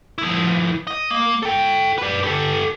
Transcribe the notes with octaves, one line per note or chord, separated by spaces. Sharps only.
F3 E4
D#5
A#3
A4 G5
B4 D5
G4 A4